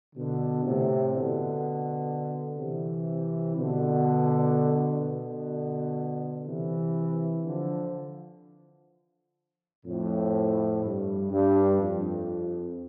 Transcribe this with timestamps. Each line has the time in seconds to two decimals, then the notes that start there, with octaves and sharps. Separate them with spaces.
0.15 B2 D3
0.64 A2 C3
1.12 B2 D3
2.57 C3 E3
3.54 B2 D3
5.00 B2 D3
6.46 C3 E3
7.42 D3 F3
9.85 F2 A2
10.82 G2
11.31 G2
11.79 F2